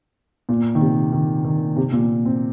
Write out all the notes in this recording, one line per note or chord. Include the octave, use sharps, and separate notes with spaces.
A#2
D#3
C3
D#3
D#3
C3
A#2
C4